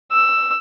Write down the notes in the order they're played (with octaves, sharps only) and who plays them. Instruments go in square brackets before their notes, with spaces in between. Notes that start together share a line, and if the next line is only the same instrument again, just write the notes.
[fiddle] E6